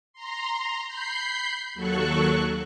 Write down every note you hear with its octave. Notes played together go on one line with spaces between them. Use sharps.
A#5 C6
B5 G6 C7
D#2 F#3 A4 C#6 F#6